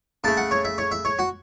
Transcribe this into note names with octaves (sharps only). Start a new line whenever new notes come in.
C#3 A3 A5
F#5
C#5
E5
C#5
E5
C#5
F#4